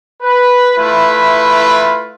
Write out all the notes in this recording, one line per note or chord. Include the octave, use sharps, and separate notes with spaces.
B4
A3 E4 F4 B4